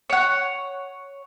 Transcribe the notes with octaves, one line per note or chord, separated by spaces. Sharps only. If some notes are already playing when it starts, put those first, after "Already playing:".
C#5 F#5